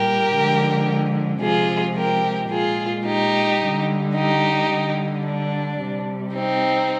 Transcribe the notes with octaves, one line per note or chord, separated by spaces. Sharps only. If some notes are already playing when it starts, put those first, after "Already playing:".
Already playing: A#2 G3 G4 A#4
D3 F3 G#3
C3 F3 G#3 F4 G#4
G4 A#4
A#2 F4 G#4
G#3
D#4 G4
D3 G3
D#4 G4
D3 G3
D4
C3 G3
C4 D#4